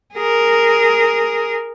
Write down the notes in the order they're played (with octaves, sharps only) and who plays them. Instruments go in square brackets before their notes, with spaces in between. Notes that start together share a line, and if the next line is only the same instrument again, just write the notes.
[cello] G#4 A#4